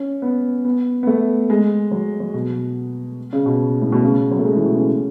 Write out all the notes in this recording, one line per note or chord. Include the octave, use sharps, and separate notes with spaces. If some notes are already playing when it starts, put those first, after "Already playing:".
Already playing: C#4
B3
B3
B3
A3
G#3
F#3
F#3
B2
C#3
B2
A2
B2
C#3
F#3
A3
G#3
E3
B2
C#3